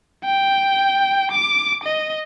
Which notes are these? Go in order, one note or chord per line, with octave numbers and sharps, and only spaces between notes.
G5
D6
D#5